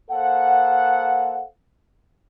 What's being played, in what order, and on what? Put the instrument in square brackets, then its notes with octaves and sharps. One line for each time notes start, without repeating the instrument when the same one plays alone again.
[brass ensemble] A#3 A4 C5 F5 F#5